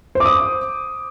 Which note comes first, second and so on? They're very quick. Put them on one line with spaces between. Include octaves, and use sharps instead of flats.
C5 D6 D#6